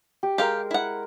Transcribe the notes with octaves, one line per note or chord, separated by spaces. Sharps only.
G4
G#3 G4 A#4 F5
E4 F#5